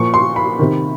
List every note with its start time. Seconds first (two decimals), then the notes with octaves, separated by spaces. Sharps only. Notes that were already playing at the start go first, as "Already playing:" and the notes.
Already playing: A#2 F3 C#6
0.14 C6
0.36 B5
0.59 C3 D#3